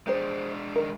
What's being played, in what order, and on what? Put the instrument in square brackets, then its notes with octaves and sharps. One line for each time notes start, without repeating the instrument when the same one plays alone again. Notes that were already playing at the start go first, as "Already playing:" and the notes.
[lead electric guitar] G#3 D4 [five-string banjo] G4 G#4 C5
[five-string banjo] D#3 A#4